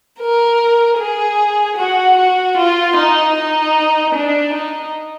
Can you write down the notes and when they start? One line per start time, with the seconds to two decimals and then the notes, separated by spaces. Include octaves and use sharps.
0.20 A#4
0.99 G#4
1.77 F#4
2.17 F#4
2.57 F4
2.96 D#4
3.35 D#4
4.14 D4
4.53 D#4